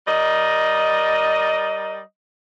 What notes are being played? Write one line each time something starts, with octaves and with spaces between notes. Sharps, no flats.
G3 A#4 D#5